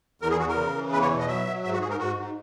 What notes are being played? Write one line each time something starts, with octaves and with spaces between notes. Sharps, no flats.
E2 A#4
G#4
E2 F#4
A#4
C#3
E3
E2 B4
C#5
B2
D#5
F#3 E5
F#3
G#2 E5
F#4
G#2 G#4
A#4
G#2 F#4
G#2